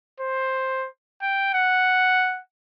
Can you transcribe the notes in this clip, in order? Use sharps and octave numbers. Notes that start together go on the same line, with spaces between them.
C5
G5
F#5